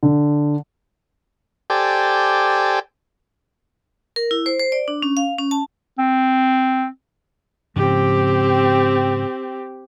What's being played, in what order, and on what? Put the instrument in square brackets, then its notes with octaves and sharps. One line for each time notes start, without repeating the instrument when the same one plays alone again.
[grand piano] D3
[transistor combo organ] G4 A4 C5 D5 G5 G#5
[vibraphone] A#4
E4
C5
C5
D5
D4
C#4
F5
C#4
A5
[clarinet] C4
[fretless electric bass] G#2 C#3 F3 [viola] C4 G4